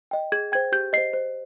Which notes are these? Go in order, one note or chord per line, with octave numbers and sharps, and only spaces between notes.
D#5 G5
G#4 G#6
C5 G5 G#6
G4 G6
C5 D#5 C7
C5